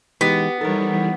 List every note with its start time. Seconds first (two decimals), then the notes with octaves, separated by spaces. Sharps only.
0.21 E3 G#3 B3 D#4 G4
0.61 E3 G3 D#4 A4 A#4 C#5